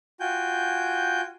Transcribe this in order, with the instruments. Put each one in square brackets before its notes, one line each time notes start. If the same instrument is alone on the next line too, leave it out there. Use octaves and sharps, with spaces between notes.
[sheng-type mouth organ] F4 F#4 G5 G#5 G6